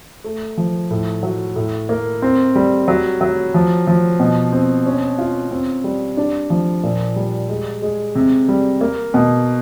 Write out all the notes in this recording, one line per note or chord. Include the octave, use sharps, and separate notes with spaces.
A3
F3
A2
F#3
A2
A#3
C4
G3
F#3
F#3
F3
F3
B2
C4
C#4
F4
C4
G3
D4
F3
A#2
G3
G#3
G#3
C3
G3
A#3
B2